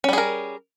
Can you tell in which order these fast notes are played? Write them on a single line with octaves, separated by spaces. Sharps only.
C#4 G3 G#4 A#4